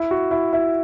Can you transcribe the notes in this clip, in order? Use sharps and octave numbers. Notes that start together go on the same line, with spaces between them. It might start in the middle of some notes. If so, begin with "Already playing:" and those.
Already playing: E4
F#4
E4
E4